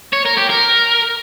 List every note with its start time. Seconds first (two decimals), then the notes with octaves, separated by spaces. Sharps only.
0.13 C#5
0.25 A#4
0.37 G4
0.50 A#4